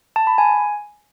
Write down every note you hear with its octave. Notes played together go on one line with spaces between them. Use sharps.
A5
B5
G#5